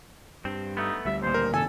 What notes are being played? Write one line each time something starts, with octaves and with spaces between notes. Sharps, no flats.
G2 C4
A3 B3 D#4
D2 G3 E5
D#2 A#2 C5
A#4
G2 C3 D#3 A4 G#5